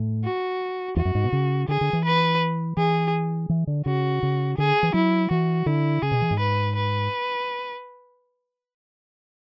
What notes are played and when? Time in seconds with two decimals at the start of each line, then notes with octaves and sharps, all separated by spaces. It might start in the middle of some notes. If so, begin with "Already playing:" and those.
Already playing: A2
0.24 F#4
0.96 E2 F#4
1.05 F#2
1.15 G#2
1.24 B2
1.32 C#3
1.68 D3 G#4
1.81 D3
1.93 E3
2.05 B4
2.77 E3 G#4
3.49 E3
3.67 D3
3.86 C#3 F#4
4.23 C#3
4.58 D3 G#4
4.83 E3
4.94 F#3 E4
5.31 E3 F#4
5.66 D3 E4
6.02 C#3 G#4
6.11 B2
6.22 E3
6.31 G#2
6.39 B4
6.76 B4